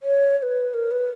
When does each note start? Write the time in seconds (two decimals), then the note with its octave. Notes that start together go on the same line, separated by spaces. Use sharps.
0.03 C#5
0.38 C#5
0.43 B4
0.74 A#4
0.91 B4